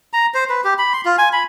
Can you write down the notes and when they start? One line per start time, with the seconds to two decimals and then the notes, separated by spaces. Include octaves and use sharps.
0.13 A#5
0.34 C5
0.49 B4
0.64 G4
0.78 B5
0.93 C6
1.05 F4
1.18 G#5
1.33 B5